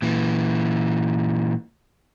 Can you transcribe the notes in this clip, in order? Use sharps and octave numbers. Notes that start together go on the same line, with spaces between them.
A#2 E3